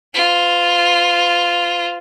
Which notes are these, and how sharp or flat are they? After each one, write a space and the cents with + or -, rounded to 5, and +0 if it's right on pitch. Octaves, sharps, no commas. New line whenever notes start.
F4 +0 C5 -45